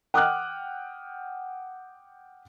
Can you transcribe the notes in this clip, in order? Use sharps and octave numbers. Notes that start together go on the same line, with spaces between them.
F#5 G5 D6 D#6 F6 F#6